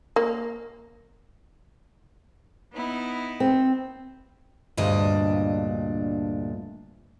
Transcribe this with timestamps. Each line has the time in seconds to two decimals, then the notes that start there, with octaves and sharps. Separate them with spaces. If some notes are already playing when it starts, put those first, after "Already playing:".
0.16 A#3
2.74 B3 D#4 E4
3.40 C4
4.77 D2 G2 A#2 D4 D#5